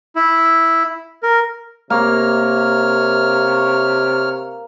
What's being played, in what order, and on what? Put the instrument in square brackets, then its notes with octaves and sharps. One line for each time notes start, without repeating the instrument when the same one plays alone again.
[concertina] E4
A#4
[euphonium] C3 [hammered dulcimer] A#3 [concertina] C#5 F6